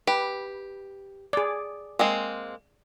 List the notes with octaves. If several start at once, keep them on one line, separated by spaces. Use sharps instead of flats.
G4 B4
G#4 D5
G#3 A#3 C4